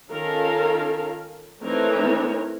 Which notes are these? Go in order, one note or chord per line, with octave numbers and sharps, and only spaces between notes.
D#3 C#4 F4 A4 A#4 F5
E3 A3 C4 D#4 A#4 C#5